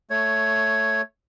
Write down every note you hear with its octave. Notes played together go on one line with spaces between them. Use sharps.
A3 C#5